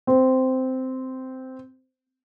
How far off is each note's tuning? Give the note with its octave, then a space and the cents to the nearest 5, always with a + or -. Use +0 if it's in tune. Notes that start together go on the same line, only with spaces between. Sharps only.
C4 -10